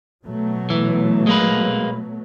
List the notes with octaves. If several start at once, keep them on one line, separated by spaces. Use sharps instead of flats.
B2 F#3 A3
E3
G#3 A#3 B4